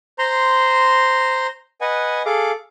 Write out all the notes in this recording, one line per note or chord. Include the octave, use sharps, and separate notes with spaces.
C5 A#5 C6
B4 D#5 F#5 G#5
G#4 A4 F5 D6